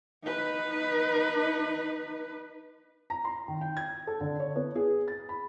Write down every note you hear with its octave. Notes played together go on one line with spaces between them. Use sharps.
D#4 B4
A#5
C6
D#3
G5
G#6
A4
D3
C#5
B3
G#4
A6
B5